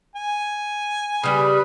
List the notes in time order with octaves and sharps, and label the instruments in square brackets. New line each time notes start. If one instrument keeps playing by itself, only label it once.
[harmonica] G#5
[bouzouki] C#3 G3 [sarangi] B4